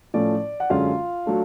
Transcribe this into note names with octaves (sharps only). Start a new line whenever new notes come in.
A2 F3 A3 C#4 D5
F#5
F#2 D3 G#3 C#4 F4 F5
F#3 A3 D4